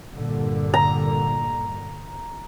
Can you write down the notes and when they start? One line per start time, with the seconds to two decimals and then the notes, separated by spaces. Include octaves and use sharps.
0.15 G2 A#2 D3
0.74 A#5